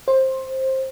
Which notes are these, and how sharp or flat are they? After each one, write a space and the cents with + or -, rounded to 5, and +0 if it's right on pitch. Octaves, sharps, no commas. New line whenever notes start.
C5 +15